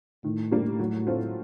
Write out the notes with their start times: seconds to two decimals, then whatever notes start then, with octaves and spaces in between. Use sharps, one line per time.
0.24 A2 D#3
0.51 G3 A#3 D4
0.80 F#3
1.07 A3 C4 F4